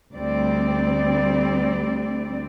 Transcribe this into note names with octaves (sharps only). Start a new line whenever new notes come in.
D2 G3 C4 D5